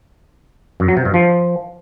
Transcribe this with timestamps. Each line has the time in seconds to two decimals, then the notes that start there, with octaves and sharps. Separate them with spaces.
0.80 F#2
0.88 F#3
0.97 C3
1.05 G2
1.14 F3